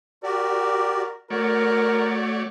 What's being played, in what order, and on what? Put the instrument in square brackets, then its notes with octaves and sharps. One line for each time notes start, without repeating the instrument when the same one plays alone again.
[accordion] F#4 G4 D5 [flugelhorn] A#4
[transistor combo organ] A3 C#5 D5 [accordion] F#4 [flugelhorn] A#4